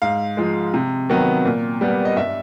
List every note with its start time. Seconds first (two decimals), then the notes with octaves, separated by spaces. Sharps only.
0.02 G#2 F5
0.37 F3 G#3
0.74 C3
1.09 D#3 F#3 B3
1.45 A#2
1.81 G3 B3
2.05 D#5
2.17 G2 E5